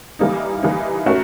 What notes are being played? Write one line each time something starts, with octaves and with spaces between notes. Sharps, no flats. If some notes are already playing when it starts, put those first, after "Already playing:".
E3 G3 A#3 D#4
E3 G3 A#3 D#4
A3 C#4 F#4 A#4